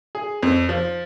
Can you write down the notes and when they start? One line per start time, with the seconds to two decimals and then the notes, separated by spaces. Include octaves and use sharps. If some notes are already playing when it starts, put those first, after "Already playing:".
0.15 G#4
0.43 F2
0.69 F3